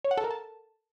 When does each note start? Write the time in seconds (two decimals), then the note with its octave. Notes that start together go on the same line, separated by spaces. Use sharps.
0.04 C#5
0.11 F#5
0.18 A4
0.24 A#4
0.31 A5